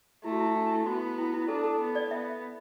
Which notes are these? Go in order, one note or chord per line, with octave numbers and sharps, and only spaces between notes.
A3 E4
F#4
E4
D4
E4
B3 F#4
E4
E4
D4 A4
A4
B3
D5
B3 E5